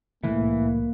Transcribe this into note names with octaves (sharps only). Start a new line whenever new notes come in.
C2 A2 E3 A#3